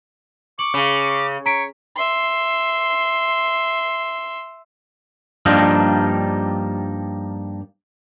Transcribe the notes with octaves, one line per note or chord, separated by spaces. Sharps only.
C#6 D6 F#7
C#3
C#5 A#5 B6 D7
E5 C6
G2 F3 G3 A#3 D4 D#4